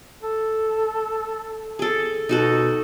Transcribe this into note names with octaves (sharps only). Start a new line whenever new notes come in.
A4
G#4 A4
B2 D#4 F#4 A4